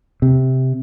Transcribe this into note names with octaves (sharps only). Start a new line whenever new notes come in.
C3